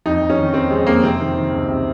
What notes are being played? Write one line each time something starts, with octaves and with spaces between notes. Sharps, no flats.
F2 D#4
F2
C#4
D#3
F2 C4
F2 G#3
F2 A#3
C3 C4
D#3
D#3
C#2
C3